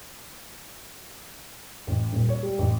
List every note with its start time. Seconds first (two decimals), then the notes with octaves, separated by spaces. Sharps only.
1.87 A1
2.12 D#1
2.29 C#5
2.43 G3
2.58 A1